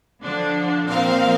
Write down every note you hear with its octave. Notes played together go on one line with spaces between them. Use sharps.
D3 F3 D4
A#2 F3 C4 A#4 F5